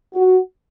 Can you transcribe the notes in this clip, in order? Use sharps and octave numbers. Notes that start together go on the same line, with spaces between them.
F#4